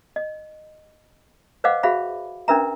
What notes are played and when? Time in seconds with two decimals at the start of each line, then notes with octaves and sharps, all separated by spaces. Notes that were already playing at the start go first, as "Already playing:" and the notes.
0.16 D#5
1.64 B4 C5 D#5 F5 F#5 D6
1.83 F#4 G#4 C5 E5 F5 B5
2.48 C#4 D4 A#4 B4 E5 A#5